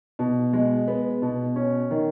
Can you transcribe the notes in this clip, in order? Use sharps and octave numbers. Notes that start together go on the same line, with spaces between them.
B2
G#3
B3
B2
C#4
D#3